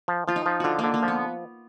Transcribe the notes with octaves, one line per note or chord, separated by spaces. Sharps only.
F3
F3 F4
D#4
F3
D3 F4 F#4
A#3
D3
A#3
F3
B3